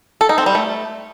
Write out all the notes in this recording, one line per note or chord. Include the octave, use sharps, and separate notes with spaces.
A4
D#4
C4
G3
A3